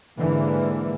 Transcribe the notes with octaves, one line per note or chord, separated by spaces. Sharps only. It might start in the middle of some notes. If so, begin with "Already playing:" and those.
G#2 D3 E3 A#3